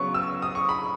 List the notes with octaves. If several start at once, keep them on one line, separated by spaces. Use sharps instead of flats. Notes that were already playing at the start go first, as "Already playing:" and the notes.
Already playing: C#3 F#3 B3 C#6
E6
D#6
C#6
B5